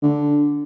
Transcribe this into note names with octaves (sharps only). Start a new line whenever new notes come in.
D3